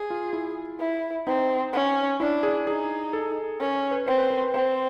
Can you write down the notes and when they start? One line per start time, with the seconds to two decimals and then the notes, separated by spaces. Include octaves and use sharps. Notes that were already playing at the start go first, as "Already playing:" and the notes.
Already playing: G#4
0.10 F4
0.33 E4
0.79 E4
1.27 C4 D#4
1.73 C#4
2.20 D4 E4
2.43 G#4
2.67 D#4 G#4
3.13 A4
3.60 C#4 A#4
3.75 C#5
3.91 B4
4.06 C4 C5
4.18 B4
4.30 A#4
4.42 B4
4.54 C4 C5